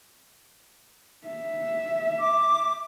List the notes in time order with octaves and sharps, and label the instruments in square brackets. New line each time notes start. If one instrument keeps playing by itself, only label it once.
[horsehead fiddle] E5
[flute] D6